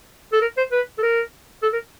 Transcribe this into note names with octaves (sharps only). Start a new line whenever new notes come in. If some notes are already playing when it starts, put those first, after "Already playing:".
A4
A#4
C5
B4
A4
A#4
A4
A#4